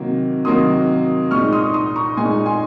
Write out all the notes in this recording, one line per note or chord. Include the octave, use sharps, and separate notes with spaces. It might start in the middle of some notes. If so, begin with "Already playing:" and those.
Already playing: C3 D#3 F#3 A#3
C3 D#3 F#3 A#3 C6 D#6
A#2 G#3 D#4 C#6 F6
C6 D#6
C6 D#6
A#5 C#6
A#2 G#3 D#4 G#5 C6
G#5 C6